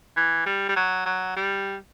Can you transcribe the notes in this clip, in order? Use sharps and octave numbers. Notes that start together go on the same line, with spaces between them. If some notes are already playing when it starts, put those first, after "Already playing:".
E3
G3
G3
F#3
F#3
G3